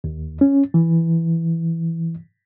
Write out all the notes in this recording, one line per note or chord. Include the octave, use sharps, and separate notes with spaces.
D#2
C#4
E3